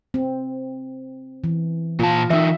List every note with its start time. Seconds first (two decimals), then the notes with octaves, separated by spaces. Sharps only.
0.14 C4
1.44 E3
2.00 A#2 F4 A5
2.30 E3 D#4 E5